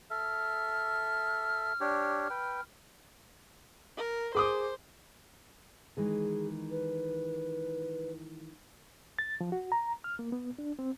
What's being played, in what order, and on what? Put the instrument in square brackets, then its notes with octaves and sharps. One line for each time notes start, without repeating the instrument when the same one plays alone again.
[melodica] A4 E5 [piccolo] F6
[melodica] D4 G4 C#5
B4 G5
[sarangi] A#4
[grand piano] G#4 D6 D#6 [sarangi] C5
[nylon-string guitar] D#3 E3 G#3 [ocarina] G#4
[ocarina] B4
[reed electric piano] A6
F3
F#4
A#5
F6
A#3
B3
D4
C4